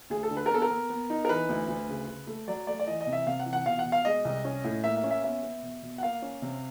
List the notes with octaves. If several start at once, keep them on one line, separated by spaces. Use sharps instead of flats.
D2 G#4
A4
D3
B4
A#4
B3 A4
A#4
B3
B3
D#4
A#4
E3 B4
D2
D2
C#3
C#3
A3
F#3 D5
A3 D5
D5
E3 D#5
D#5
C3
E5
C3 F5
F#5
E3
F#5
B2 F5
F#5
B2
F5
G#3 D#5
C2
C#4
A2
A#3 E5
E5
C#4
E5
B3 E5
B3
B2
B2
F#5
A#3 F5
C#4
C3